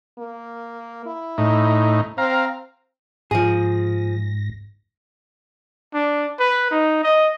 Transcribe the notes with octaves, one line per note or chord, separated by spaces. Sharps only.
A#3
E4
A2 D#4
C4 F5 A#5
G#2 F3 G#4 A#6
D4
B4
D#4
D#5